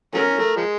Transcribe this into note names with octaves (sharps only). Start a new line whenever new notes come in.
F#3 A3 C#4 A#4
A3
F3 G#3